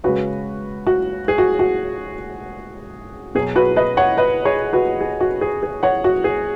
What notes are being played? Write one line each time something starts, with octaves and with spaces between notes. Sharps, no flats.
C#3 G#3 F#4 B4
F#4
G#4
F#4
F#4
B2 F#3 G#4
F#4 B4
B4 D#5
C#5 F#5
B4 D#5
G#4 C#5
F#4 B4
G#4
F#4
G#4
G#4
C#5 F#5
F#4
G#4